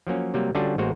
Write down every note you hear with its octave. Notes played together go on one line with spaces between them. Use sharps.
F3 F#3 A#3 C#4
C3 F#3 G3 A#3
D3 G3 C#4 D4 F4 F#4
A1 G#3 A#3 F#4 C5